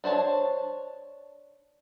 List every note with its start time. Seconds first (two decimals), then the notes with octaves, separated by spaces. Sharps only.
0.04 D4 C5 C#5 A5